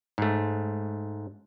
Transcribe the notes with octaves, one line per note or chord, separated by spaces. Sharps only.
G#2 A3